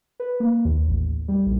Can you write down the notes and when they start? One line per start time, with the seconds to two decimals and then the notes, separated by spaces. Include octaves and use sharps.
0.20 B4
0.40 A#3
0.65 D#2
0.88 A1
1.28 G3
1.46 A#1